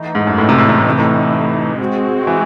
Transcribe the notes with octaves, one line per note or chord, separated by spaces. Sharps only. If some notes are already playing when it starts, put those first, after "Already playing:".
Already playing: E3 A3 D#4
G#2
F#2
A2
C3
A2
C3
A2
C3
A2
G#3 C4 F#4
E3